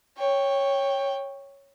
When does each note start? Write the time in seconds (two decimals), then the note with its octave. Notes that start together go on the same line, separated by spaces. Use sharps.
0.17 C#5 G5